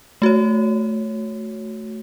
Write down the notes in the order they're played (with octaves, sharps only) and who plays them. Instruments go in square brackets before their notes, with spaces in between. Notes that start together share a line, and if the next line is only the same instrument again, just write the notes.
[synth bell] A3 F#4 C#5